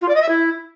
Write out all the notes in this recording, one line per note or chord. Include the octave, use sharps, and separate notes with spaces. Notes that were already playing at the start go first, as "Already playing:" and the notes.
F4
D5
D#5
E5
E4